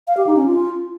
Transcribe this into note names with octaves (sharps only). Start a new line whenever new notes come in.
F5
G4
D#4
C#4
F4